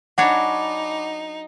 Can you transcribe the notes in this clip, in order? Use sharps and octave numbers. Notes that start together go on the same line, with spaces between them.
F#3 D4 D#4 C#5 F#5 G#5 B5 D6